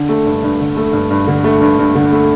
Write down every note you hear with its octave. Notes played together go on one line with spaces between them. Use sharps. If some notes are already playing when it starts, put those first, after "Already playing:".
Already playing: D3
A3
G2
G2
D3
A3
G2
G2
D3
A3
G2
G2
D3
A3